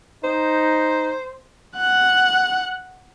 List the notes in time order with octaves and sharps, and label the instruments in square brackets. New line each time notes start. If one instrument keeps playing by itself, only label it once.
[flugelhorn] D#4 [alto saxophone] C5
[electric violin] F#5 F#6